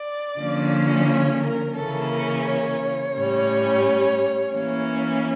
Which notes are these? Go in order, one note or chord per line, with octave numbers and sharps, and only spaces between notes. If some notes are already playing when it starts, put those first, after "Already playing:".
Already playing: D5
D3 F3 A#3 C#4
C#5
A#4
C#3 E3 A#3 C#4 A4
A#4
C#5
A2 G3 C#4
E3 A#3 C#4